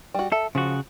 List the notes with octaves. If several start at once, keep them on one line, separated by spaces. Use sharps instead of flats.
G3 F#4
A4 E5
C#3 F3 F#4